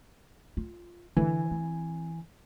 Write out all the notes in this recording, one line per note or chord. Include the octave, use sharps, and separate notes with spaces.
F4
D3 E3 G#5
C4